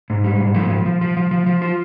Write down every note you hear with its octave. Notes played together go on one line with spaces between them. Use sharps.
G#2
G3
G#2
F3
F3
F3
F3
F3
F3
F3
F4